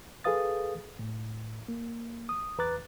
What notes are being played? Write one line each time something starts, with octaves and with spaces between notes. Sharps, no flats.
G#4 A4 B4 F5 D#6 A6
A2
A#3
D#6
E2 B4 A#5 D6 F#6 A6